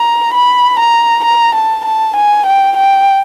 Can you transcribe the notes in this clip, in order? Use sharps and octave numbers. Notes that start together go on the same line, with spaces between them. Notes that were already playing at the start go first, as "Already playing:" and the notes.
Already playing: A#5
B5
A#5
A#5
A5
A5
G#5
G5
G5